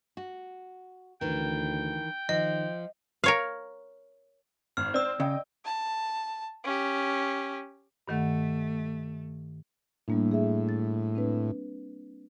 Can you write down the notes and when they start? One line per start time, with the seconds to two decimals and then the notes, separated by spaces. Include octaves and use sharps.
0.17 F#4
1.21 D2 D#3 E3 G5
2.29 D#3 F3 D#5
3.24 A#4 C#5 F5
4.77 G#1 F6
4.94 C4 D5 E6
5.20 C#3 D#5 G5
5.65 A5
6.64 C#4 G4
8.07 G2 D#3 A3 F#5
10.08 A2 G3 A#3 D4
10.31 G#4 E5
10.69 A6
11.15 C4 D4 B4